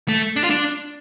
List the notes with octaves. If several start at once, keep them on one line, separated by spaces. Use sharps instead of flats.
A3
D4
F4
D4